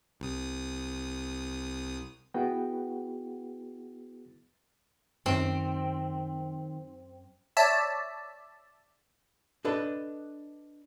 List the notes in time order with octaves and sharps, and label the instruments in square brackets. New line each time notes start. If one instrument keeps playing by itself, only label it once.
[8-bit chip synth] C2 D#6
[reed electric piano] B3 E4 F#4 G#4 B4 G5
[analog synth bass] F#2 [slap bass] D#3 [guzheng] C4
[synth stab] C#5 D5 E5 A5
[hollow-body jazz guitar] D4 A4 B4 D#5